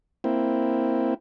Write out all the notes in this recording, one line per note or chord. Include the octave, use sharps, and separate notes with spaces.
A#3 C4 E4